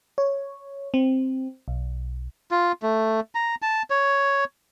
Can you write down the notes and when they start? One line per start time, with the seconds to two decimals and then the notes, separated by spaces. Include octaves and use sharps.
0.18 C#5
0.94 C4
1.68 B1
2.51 F4
2.83 A3
3.35 A#5
3.62 A5
3.90 C#5